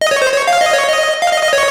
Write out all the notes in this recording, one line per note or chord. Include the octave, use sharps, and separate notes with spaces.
D#5
C#5
C5
C#5
F5
D#5
C#5
D#5
F5
D#5
D#5
C#5